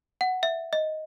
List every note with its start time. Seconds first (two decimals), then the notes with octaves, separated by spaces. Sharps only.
0.21 F#5
0.43 E5
0.73 D#5